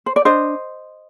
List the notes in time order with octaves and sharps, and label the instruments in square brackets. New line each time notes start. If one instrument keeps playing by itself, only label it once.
[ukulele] C5
D5
D4 C5 D#5